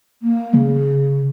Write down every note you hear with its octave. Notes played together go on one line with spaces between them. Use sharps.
A#3
C#3